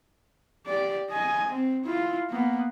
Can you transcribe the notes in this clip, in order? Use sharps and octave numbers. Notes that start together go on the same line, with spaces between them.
G4 D5
D#5 G#5
C4
E4 F4
A#3 B3